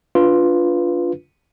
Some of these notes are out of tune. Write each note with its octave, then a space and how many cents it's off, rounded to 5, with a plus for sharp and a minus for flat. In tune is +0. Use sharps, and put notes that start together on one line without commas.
D4 -15 F4 +0 B4 +0